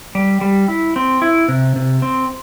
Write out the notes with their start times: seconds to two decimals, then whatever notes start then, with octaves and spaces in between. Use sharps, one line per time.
0.15 G3
0.41 G3
0.68 E4
0.96 C4
1.22 E4
1.48 C3
1.76 C3
2.02 C4